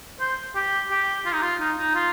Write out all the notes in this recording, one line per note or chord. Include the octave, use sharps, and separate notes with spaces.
C5
G4
G4
F4
D#4
F4
D#4
D#4
F4